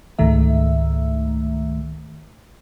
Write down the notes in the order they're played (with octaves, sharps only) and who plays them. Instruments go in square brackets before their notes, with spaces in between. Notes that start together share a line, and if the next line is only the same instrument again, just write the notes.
[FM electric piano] C#2 G#2 D#3 A3 E5